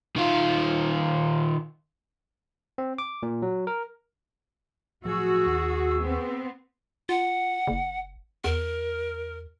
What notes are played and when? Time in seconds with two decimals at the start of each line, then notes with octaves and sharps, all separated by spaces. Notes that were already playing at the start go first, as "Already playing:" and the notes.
0.16 D#3 F4
2.78 C4
2.98 D6
3.23 A#2
3.42 F#3
3.67 A#4
5.05 A2 F3 F#3 F#4 G#4 C#6 E6
5.46 D#2
5.99 B3 C4
7.09 F4 F#5
7.67 F#1
8.44 E2 A#4